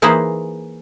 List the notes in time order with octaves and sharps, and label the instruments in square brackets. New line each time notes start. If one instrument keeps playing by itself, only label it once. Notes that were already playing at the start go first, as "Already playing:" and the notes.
[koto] E3 A#3 D#4 G#4 B4 C5